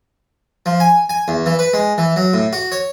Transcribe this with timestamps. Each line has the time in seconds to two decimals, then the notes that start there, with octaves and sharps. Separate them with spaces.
0.66 F3
0.80 G#5
1.10 G#5
1.28 E2
1.46 E3
1.59 B4
1.73 G#3
1.98 E3
2.16 F#3
2.33 A2
2.53 F#4
2.72 C#5